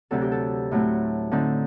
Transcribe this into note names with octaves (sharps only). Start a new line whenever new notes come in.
D2 C3 F#3 C4 A4
G4
A4
A2 F#3 A3 C4
D3 A3 C4 D#4